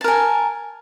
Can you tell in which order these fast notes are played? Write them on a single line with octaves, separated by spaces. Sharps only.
A5 A#4 G#5